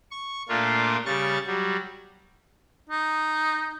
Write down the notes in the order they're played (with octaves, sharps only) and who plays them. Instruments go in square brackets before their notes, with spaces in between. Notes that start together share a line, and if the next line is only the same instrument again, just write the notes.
[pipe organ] C#6
A#2 A3 A#3 D4 F4
C#3 G3 C#6 A6
F#3 G3
[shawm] D#4